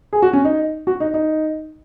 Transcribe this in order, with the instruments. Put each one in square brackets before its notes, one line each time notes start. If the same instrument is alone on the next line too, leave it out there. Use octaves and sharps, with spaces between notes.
[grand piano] G#4
F#4
C#4
D#4
F#4
D#4
D#4